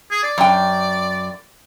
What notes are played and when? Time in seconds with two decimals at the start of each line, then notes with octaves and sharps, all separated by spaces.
0.11 G#4
0.23 D5
0.38 F#2 G5